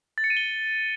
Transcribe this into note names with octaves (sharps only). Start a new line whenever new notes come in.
A6
C#7
D#7
G7